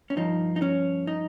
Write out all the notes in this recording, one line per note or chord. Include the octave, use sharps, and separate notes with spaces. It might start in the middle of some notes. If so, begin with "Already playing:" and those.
C#4
G2 F3 D#4
D#4
C#4
D#4